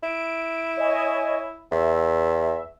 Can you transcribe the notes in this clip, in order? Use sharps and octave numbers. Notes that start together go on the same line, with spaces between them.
E4 D7
C#5 D#5 G#5
E2 E5